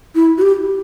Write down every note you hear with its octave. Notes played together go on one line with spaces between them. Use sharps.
E4
F#4
G4